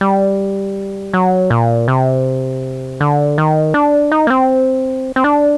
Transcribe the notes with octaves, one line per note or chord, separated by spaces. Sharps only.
G3
F#3
A#2
C3
D3
D#3
D4
D#4
A#3
C4
C4
D4